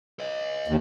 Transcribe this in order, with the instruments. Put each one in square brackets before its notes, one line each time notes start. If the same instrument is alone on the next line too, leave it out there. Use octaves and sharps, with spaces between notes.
[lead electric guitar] C#5 D#5
[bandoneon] D#2